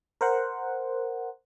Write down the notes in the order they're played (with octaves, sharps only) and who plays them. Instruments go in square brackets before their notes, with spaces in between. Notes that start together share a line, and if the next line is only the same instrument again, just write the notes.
[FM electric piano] A#4 C5 F#5